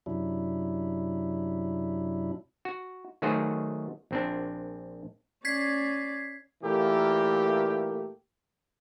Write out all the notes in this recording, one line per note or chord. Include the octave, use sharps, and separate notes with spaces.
F#2 C3 F#3 D4 E4
F#4
D#3 F#3 A3 F#4 G#4 C5
A#1 C4 D4
C#4 D5 G#6 B6 C7
A#2 E3 A3 A#3 G4